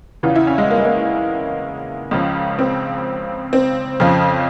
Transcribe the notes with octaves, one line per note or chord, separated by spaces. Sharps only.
E2 C#3 E3 F4
E4
C#4
G#3
A#3
G#3
A#3
C#2 C#3 F3
C4
C4
F2 C#3 F3